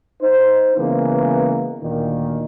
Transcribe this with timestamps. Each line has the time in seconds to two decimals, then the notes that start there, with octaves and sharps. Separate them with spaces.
0.21 D#4 C5
0.77 C#3 E3 G#3 A#3 B3
1.81 D2 A#2 D#3